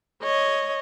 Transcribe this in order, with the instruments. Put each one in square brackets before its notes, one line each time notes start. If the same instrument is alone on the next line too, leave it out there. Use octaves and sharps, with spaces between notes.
[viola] C#5 D#5